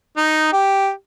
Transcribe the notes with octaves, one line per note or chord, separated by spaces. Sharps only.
D#4
G4